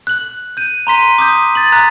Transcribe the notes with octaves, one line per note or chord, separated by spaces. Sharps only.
F#6 F#7
G6 D#7
A#5 C6 B6 D#7
D6 D#6 G6
A6 F#7
A#5 F#6 G#6 B6